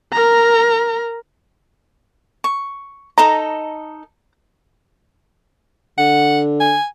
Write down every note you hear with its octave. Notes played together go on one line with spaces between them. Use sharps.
A#4 A#5
C#6
D#4 A4 D#5 A#5
D3 F#5
G#5